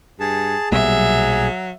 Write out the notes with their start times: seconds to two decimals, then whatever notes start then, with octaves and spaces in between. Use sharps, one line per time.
0.20 G2 G#4 A5
0.72 B1 A#2 F#3 G3 G#4 E5